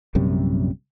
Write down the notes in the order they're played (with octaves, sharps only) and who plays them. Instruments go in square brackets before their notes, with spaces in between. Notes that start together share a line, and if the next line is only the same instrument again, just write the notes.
[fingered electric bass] A#1 F#2 C3 G3